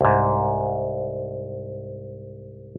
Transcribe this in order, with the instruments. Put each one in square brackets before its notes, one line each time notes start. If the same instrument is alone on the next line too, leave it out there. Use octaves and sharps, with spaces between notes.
[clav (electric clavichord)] C2 G#2